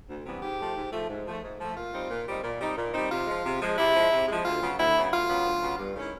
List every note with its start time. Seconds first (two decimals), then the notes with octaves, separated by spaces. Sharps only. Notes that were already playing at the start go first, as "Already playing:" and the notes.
0.09 D2
0.26 C3 E3 G3 B3
0.43 G#2 G4
0.59 F3 A3
0.76 G#2
0.92 F3 A3
1.09 G#2
1.27 F3 A3
1.43 G#2
1.59 F3 A3
1.76 A#2 F4
1.93 G3 C4 D#4
2.10 A#2
2.27 G3 C4 D#4
2.43 A#2
2.60 G3 C4 D#4
2.77 A#2
2.94 G3 C4 D#4
3.10 C3 F4
3.27 F3 G#3
3.44 C3
3.61 F3 G#3
3.78 C3 E4
3.94 F3 G#3
4.11 C3
4.28 F3 G#3
4.44 D2 F4
4.61 C#3 F#3 B3
4.78 D2 E4
4.95 C#3 F#3 B3
5.12 D2 F4
5.29 C#3 F#3 B3
5.45 D2
5.62 C#3 F#3 B3
5.79 G2
5.95 D#3 G#3 C#4 E4